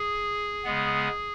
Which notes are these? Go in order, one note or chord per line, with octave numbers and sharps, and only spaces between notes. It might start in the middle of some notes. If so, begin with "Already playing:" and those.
Already playing: G#4
C#3 G#3 B3